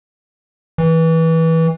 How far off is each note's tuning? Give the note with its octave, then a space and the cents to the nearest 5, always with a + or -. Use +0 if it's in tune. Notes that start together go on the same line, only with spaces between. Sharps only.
E3 -20